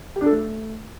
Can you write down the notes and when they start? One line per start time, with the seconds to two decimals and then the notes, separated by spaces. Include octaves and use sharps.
0.16 G4
0.21 D4
0.26 A4
0.31 A3